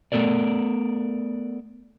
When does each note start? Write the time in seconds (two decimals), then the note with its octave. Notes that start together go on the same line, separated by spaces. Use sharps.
0.12 A3 B3 A4 A#4 D5